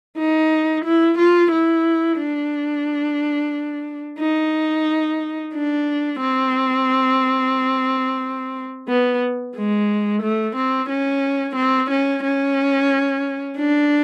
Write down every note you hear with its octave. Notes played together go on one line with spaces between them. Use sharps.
D#4
E4
F4
E4
D4
D#4
D4
C4
B3
G#3
A3
C4
C#4
C4
C#4
C#4
D4